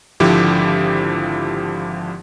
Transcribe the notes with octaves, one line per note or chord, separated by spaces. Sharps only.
G#1 D3 F3 E4 G4